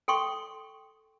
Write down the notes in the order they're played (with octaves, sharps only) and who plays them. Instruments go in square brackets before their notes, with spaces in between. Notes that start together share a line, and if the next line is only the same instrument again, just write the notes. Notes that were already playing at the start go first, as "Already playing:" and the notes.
[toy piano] A4 G5 C6 C#6